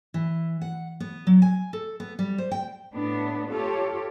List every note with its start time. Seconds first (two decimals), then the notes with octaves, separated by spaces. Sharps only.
0.14 E3
0.61 F#5
1.00 B3
1.27 F#3
1.42 G#5
1.73 A4
2.00 B3
2.19 G3
2.38 C5
2.51 G5
2.93 A2 B3 D4
3.50 F4 G4 A4 C#5